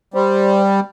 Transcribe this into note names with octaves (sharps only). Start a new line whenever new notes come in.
G3 C5